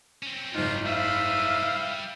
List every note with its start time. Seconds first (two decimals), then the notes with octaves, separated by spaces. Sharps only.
0.23 C4 C#4
0.54 F#1 G#2 F4
0.86 G3 B4 E5 F5